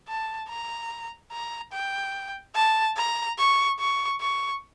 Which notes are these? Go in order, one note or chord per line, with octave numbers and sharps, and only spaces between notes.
A5
A#5
A#5
G5
A5
A#5
C#6
C#6
C#6